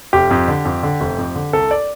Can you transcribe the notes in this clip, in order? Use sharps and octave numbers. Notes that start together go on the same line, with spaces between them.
F1 G4
F2
D3
F2
D3
F1
F2
D3
C2 A4
D5